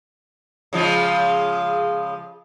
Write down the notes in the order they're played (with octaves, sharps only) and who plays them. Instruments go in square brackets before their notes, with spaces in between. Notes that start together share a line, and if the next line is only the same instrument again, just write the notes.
[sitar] C#3 F3 G#3